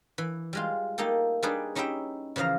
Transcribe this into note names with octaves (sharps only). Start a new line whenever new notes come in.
E3
G3 G#3 F4
A3 A#3 D#4 G4 A4
G3 D4 D#4 G#4 B4 D5
C#4 D#4 E4 G4 E5 G5
C#3 E3 F3 F5 A#5